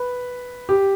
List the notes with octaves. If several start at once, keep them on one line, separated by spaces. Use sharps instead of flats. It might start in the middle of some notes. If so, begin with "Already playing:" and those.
Already playing: B4
G4